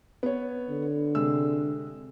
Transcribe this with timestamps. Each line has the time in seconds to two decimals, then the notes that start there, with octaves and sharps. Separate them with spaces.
0.23 B3 C#5
0.69 D3
1.15 C3 G#3 E6